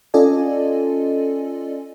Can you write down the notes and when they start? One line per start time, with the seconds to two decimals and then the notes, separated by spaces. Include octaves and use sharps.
0.14 C#4 F4 A4 D5 D#5 G#5